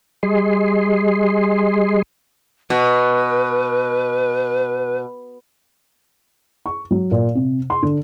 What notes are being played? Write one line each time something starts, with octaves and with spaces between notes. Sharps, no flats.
G3 G#4 D#5 C6
B2 B4
C#6
F#3
A#2
C3
C6
D3